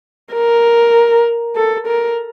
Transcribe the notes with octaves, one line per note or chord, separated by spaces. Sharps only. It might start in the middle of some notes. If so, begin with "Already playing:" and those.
A#4
A4
A#4